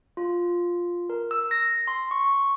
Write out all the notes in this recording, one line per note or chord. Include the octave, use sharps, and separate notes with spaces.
F4
A#4
E6
A#6
C6
C#6